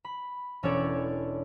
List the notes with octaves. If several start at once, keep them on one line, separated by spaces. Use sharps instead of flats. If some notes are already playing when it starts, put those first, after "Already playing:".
B5
E1 C#4 D4 A4 C#5 D5